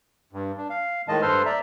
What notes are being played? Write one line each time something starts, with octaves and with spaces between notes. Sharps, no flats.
G2
D4
F5
A2 D#3 G#3 D#5 A5
G2 A4 B4 C5 C6 F6
D5 E5 A#5